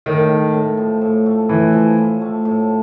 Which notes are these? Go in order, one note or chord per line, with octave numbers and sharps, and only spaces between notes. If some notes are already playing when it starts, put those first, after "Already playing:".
A2 D#3
A3
A2
F3
A2
A3
A2 E3
F3
A2
A3
A2